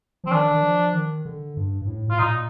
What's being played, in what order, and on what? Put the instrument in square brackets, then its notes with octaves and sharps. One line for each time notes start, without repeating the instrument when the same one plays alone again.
[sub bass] F3 [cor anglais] C4
[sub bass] D#3 [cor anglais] D4
[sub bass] D#3
F3
D#3
D3
G2
G2
A2
[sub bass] A2 [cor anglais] F4
[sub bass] A#2 [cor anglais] D#4